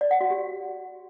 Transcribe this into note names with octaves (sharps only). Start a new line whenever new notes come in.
D5
F#5
F#4
G4